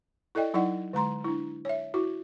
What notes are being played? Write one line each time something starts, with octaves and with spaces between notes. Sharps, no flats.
E4 A4 D5 D#5 G5
F#3 D#4 E4 D5 D#5 F#5
D3 G#3 A#5 C6
D4 E4
C#5 E5
E4 F#4